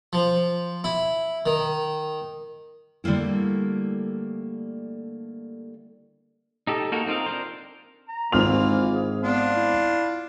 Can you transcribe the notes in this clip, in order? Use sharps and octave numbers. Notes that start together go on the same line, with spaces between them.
F3
E4
D#3
D3 G3 A3 A#3 E4
D#4 G4 A4
A#3 D#4 F#4 A4 A#4
C4 D#4 F4 A#4 F5
D4 A#4 C5
A#5
G#1 E3 A#3 F4 F6 F7
G#4
B3 D4 F4
E4